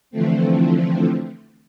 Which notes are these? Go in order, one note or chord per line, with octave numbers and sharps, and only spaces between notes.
D3 E3 F3 A3 C4